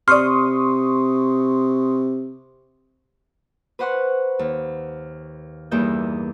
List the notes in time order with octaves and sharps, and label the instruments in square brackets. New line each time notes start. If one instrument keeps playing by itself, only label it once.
[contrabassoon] C3 [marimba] D5 F6 [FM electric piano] C6 C#6 D#6
[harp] B4 C5 F#5 C6 C#6
D#2
E2 G2 A#3 D#4 E5 G6